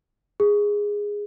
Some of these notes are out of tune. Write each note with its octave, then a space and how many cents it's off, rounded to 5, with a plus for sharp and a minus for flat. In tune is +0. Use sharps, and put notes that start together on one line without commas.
G#4 -10